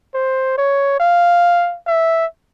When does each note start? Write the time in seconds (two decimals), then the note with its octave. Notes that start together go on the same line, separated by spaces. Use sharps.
0.14 C5
0.58 C#5
1.00 F5
1.87 E5